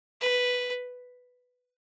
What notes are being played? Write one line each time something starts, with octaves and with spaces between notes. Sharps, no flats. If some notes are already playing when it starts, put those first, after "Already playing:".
B4